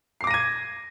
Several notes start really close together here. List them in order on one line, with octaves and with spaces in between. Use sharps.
C7 D6 A#6 D#7 G#6